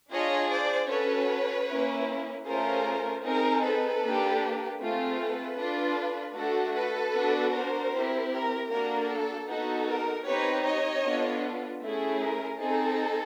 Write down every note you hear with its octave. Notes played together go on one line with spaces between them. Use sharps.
D4 F4 G#4 C#5 D#5
C5 D5
C#4 F#4 A4 B4 C#5
A#3 C#4 E4
A3 C#4 F4 G#4 A#4 C5
C4 D#4 G#4 A#4
A4 B4
A#3 D4 G4
A3 C4 F4 G#4
A4 B4
D4 F4 A4
A3 D4 F#4 A4
A4 B4
B3 D4 F#4
A#4 C5
C4 E4 G4
A#4
A#3 D4 F#4 A4 A#4
A4
B3 D#4 F#4 A4
A#4
C4 D#4 G4 B4 C#5
C#5 D#5
B3 D4 F4 A4
A3 C#4 E4 G#4
A#4
C4 D#4 G#4 A4